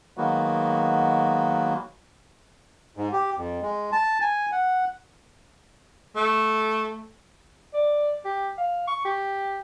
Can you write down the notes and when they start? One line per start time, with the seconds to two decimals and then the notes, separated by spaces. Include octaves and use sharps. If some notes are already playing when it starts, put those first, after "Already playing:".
0.17 D#3 F#3 G#3 A#3 B3 F#4
2.97 G#2
3.12 G4
3.37 F2
3.62 G#3
3.92 A5
4.21 G#5
4.52 F#5
6.16 A3
7.74 D5
8.25 G4
8.58 F5
8.87 C#6
9.05 G4